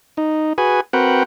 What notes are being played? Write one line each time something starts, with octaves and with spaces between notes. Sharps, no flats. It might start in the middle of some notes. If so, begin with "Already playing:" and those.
D#4
F#4 G#4 B4 G#5
C4 F#4 A#4 B4 F#5 G5